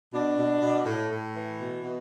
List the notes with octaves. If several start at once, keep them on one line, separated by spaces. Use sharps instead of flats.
B2 D4
B2
B2
A2
A2
E3
B2
B2